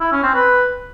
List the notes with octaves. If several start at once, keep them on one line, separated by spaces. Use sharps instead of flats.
E4
C#4
C4
B4